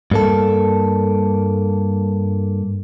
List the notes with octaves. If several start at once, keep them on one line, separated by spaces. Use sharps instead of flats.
G2 A#3 A4